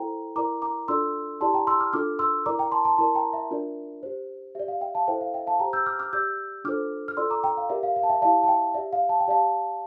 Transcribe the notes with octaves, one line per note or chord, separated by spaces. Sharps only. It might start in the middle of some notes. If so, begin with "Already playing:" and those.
Already playing: E4 A4 C5 G5 A#5
E4 A#4 D5 A#5 D6
A#5 D6
D4 F4 A4 D5 C6 E6
E4 G4 D5 A5 C6
G5 A#5
C6 E6
D6 F6
D4 F4 A4 D6 F6
C6 E6
E4 A#4 D5 A#5 D6
G5 A#5
A5 C6
A5 C6
E4 A#4 D5 A5 C6
G5 A#5
E5
D4 F4 A#4 D5
G4 C5
G4 D5 E5
F5
E5 G5
F5 A5
E4 A4 C5 E5 G5
F5
E5 G5
F5 A5
G4 C5 G5 A#5
E6 G6
D6 F6
D6 F6
G4 D5 E6 G6
D4 F4 A4 C5 D6 F6
F6
F4 A4 D5 C6 E6
A#5 D6
G5 A#5
F5
G4 A#4 D5 E5
F5
F5
A5
E5 G5
E4 G4 D5 F5 A5
A5
E5 G5
G4 D5 E5
F5
A5
G5
G4 D5 F5 A5